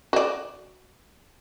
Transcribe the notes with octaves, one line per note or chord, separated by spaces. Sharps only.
F#4 D5